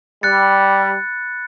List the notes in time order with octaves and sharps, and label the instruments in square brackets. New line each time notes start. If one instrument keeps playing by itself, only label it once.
[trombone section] G3 [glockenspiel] B5 F#6 A6 C#7